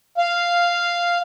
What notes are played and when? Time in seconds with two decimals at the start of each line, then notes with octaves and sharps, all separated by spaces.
0.18 F5